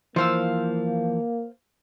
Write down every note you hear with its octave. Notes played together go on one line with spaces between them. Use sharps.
E3 F3 A#3 C5 F5 E6